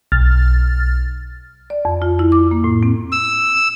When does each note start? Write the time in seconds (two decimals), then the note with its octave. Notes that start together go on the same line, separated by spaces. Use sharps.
0.12 B1 F6 A6
1.70 D5
1.85 F2
2.02 F4
2.19 E4
2.32 D6
2.51 A#3
2.64 A2
2.83 C4
3.12 E6